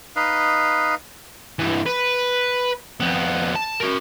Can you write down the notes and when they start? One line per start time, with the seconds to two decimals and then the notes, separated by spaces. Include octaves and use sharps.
0.16 D#4 B4 D#5 F5
1.59 G2 E3
1.86 B4
3.00 F2 B3
3.56 A5
3.80 F#4 A#4